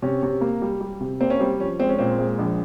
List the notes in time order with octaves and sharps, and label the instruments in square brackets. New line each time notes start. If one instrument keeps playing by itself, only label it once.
[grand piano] C3 [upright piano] C#4
[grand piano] C3
A#3
G3
G3
C3
[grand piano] A#3 [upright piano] C4
[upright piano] C#4
[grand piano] G3 [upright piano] C4
[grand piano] F3 [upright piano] C#4
[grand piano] G#3 [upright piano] C4
[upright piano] C#4
[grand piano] A#2 [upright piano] C4
[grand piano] G#3
A#1